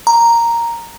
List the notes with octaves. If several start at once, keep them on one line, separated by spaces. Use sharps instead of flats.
A#5